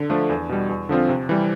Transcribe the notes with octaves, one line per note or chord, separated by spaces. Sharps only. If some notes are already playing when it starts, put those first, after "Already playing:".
Already playing: D3
F3 A3 D4
E2
B2 G3
E2
D3 F3 C4 F4
C3
E3 G3